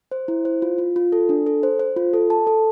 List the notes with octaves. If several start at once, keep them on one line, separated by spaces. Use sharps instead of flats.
C5
E4
C5
F4
F4
F4
A4
D4
A4
C5
C5
F4
A4
A5
A4